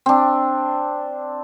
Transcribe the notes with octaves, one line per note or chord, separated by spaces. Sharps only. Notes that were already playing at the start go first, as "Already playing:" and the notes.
C4 D4